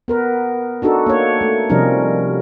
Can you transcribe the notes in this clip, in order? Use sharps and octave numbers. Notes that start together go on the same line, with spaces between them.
B3 A#4 B4
D4 D#4 F#4 A4
A#3 C#5
A3
C3 F3 G3 C#4 D#4 A#4